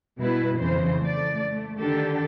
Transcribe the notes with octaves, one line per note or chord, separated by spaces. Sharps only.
B2 G3 E4 B4
F2 C#3 E3 C5
A3 D5
A3
D3 D#3 D4 G4 A4